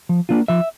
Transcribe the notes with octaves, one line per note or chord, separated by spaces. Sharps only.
F3
A#3 D4 F4
F3 E5